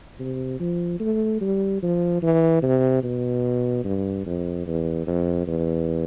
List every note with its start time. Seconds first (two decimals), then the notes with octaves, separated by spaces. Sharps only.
0.20 C3
0.60 F3
1.00 A3
1.41 G3
1.82 F3
2.22 E3
2.63 C3
3.03 B2
3.84 G2
4.26 F2
4.66 E2
5.07 F2
5.47 E2